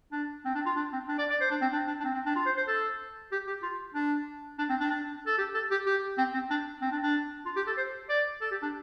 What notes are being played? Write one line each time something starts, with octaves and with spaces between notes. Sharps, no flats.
D4
C4
D4
F4
D4
C4
D4
D5
D5
C5
D4
C4
D4
D4
D4
C4
C4
D4
F4
C5
C5
A4
G4
G4
F4
D4
D4
C4
D4
D4
A4
G4
A4
G4
G4
C4
C4
D4
C4
D4
D4
F4
G4
A4
C5
D5
A4
G4
D4